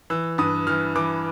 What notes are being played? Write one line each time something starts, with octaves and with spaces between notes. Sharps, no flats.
E3 E6
G2 D#6
E3 F6
E3 D6